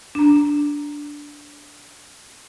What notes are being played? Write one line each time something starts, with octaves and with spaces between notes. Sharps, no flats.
D4 A#5